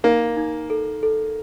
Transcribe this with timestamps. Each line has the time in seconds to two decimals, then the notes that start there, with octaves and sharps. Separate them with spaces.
0.04 A#3 D#4
0.37 D#4
0.70 A4
1.03 A4